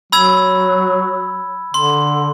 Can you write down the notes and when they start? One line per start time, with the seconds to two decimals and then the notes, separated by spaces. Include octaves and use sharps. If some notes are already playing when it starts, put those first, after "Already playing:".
0.12 F#3 B5 E6 G#6
1.74 D3 C6